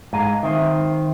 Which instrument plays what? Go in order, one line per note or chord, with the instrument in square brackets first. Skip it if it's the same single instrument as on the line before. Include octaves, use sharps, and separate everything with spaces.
[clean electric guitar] G#2 G#3 [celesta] F5 A#5 D#7
[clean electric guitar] D#3 C4 [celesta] E5